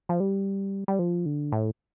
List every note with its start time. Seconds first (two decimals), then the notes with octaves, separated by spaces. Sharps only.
0.09 F3
0.20 G3
0.88 G3
0.99 F3
1.26 D3
1.52 A2